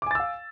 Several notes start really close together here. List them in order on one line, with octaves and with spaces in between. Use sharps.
D6 G#5 A6 E6 F5